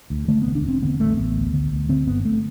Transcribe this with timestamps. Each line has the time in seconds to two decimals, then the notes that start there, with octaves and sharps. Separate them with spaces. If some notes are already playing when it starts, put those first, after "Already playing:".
0.10 D2
0.28 D3 A3
0.42 E1 B3
0.55 D4
0.63 E1
0.68 C4
0.82 D3 B3
1.00 A1 A3
1.17 A1 B3
1.36 D2
1.53 D3
1.71 D2
1.89 D3 C4
2.07 G1 B3
2.25 A3